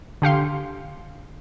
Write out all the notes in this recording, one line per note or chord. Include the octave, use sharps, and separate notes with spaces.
D3 G4 F5 C6